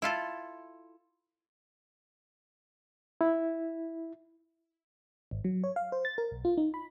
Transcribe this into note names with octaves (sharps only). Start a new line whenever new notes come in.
E4 F4 A4
E4
G#1
F#3
C#5
F5
C5
A6
A#4
B1
F4
D#4
B5